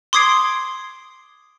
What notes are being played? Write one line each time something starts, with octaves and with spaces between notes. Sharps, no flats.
C6 D6 D#6 G#6 C7 D7